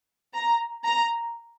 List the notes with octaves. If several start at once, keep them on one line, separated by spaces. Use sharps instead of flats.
A#5
A#5